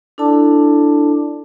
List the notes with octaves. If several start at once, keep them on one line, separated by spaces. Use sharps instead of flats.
D4 E4 A4 D5 A5 D6